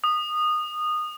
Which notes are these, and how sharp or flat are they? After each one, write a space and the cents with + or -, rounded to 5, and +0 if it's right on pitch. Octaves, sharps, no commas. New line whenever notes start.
D#6 -20